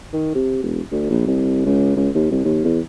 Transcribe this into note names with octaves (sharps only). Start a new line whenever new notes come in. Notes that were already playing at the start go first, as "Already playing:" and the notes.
D#3
C3
E1
D2
A#1
C2
C#2
C#2
D#2
C2
D#2
E2